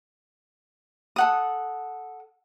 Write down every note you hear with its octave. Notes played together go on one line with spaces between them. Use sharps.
A4 F#5 D#6